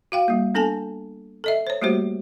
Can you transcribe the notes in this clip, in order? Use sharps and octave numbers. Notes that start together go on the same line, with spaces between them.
F#4 F5 G5
G3 A#3
B3 D4 A4 G#5 A5
A4 D#5 E5
C5 C#5
G3 A3 A#3 F#4 G4 C5